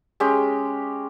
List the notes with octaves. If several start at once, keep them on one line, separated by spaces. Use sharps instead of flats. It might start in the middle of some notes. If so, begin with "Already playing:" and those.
G#3 C#4 G4